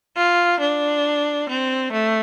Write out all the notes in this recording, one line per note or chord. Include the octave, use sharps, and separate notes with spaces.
F4
D4
C4
A3